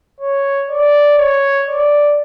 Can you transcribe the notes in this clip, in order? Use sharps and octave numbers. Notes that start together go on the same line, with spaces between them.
C#5
D5
C#5
D5